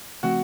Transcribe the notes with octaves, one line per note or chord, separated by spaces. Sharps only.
C#3 F3 A3 C4 F#4